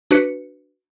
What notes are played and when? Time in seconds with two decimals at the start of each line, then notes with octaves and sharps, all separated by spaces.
0.11 D4 F#4 B4 C#7